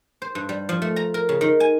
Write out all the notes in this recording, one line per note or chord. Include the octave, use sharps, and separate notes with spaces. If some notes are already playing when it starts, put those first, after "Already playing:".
C5
G2
G3
F3
A3
A#5
A#4
C#3
D#3
G#5